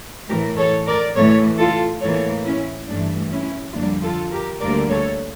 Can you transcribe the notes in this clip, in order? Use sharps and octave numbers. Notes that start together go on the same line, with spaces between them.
A2 E3 A3 G4 A#4
A4 C#5
A#4 D5
A2 E3 A3 A4 C#5
F4 A4
A2 E3 A#3 A4 C#5
C#4 E4
G2 E3 A3 D4
C#4 E4
F2 D3 G3 A#3 D4 F4
F4 A4
G4 A#4
D2 D3 G3 A#3 A#4 D5
A4 C#5